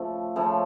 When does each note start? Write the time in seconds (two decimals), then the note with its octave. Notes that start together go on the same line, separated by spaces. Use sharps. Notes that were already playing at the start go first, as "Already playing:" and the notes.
Already playing: C#3 F3 A3
0.36 C#3 F3 A3